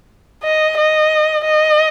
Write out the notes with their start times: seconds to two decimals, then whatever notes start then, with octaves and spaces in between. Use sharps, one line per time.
0.43 D#5
0.77 D#5
1.44 D#5